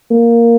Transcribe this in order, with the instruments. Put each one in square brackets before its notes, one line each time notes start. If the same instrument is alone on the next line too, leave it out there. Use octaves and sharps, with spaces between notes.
[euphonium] A#3